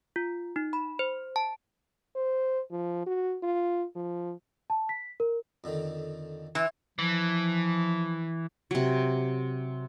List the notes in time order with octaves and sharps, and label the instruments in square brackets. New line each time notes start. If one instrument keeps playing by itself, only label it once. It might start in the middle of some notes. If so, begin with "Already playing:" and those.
[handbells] F4
D#4
B5
C5
A5
[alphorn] C5
F3
F#4
F4
F3
[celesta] A5
B6
A#4
[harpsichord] F2 D3 D#3
[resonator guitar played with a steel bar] E3 [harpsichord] E5 C6
[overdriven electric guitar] E3 [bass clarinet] F3
[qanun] C3 F#3